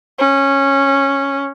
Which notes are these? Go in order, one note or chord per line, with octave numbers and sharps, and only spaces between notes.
C#4